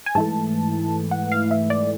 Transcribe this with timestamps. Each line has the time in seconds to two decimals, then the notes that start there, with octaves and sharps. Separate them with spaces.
0.06 G#5
0.15 G#2 E3 A3 A5
1.11 F#5
1.32 F5
1.51 E5
1.70 D5